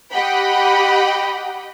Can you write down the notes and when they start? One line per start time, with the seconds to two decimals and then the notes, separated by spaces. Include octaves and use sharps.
0.12 G4 D#5 F#5 G5 B5